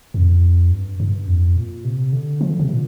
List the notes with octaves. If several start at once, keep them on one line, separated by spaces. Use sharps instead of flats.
F2
G2
G2
F2
A#2
C3
D3
F3
D3
C3
A#2